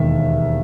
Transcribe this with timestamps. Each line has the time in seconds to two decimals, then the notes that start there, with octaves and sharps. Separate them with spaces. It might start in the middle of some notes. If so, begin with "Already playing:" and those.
Already playing: E1 D#2 D#3 E5